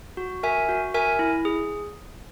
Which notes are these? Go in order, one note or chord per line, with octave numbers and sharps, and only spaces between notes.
F#4
A#4 E5 G#5
F#4
A#4 E5 G#5
E4
G#4